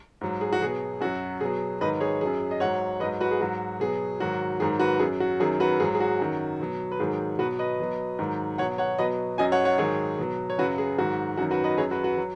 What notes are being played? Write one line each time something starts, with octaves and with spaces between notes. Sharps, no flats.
G#2 F#3
G#4
F#4
B2 F#3 G#4
F#2 F#3 F#4
B2 F#3 G#4
G#2 D#3 F#3 B4 D#5
G#4 C#5
F#2 F#3 G#4
D#5
G#2 F#3 C#5 F#5
G#2 F#3 B4 D#5
F#4 B4
G#4
G#2 F#3 F#4
B2 F#3 G#4
G#2 D#3 F#3 F#4
G#2 D#3 F#3 G#4
F#4 B4
F#2 F#3 G#4
F#4
F#2 D#3 F#3 G#4
F#4 B4
G#2 F#3 G#4
G#4
F#4
F#2 D#3 F#3
B2 F#3
B4
G#2 D#3 F#3 G#4
B2 F#3 F#4 B4
B4 D#5
B2 F#3
G#2 D#3 F#3
B2 F#3 C#5 F#5
C#5 F#5
B2 F#3 B4 D#5
F#2 F#3 D#5 G#5
C#5 F#5
C#5 F#5
G#2 D#3 F#3 G#4 C#5
B2 F#3
C#5
F#2 C#3 F#3 F#4 B4
G#4
G#2 D#3 F#3 F#4
F#2 D#3 F#3 F#4
F#4 B4
B4 D#5
F#2 F#3 G#4 C#5
F#4 B4
F#4 B4
F#3